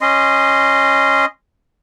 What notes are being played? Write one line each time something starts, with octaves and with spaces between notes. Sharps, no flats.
C#4 D#5 C6